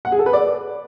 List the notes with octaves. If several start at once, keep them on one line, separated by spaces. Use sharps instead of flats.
F#5
G#4
A4
B4
D5